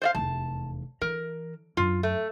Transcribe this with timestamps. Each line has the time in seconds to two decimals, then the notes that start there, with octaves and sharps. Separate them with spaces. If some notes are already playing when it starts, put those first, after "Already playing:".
0.02 C5 D5 F5
0.15 F1 E2 A5
1.01 E3 A#4
1.77 F#2 F4
2.03 A3